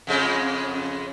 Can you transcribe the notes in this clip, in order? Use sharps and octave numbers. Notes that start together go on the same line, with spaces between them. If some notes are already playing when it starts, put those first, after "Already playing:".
F2 C#3 G#3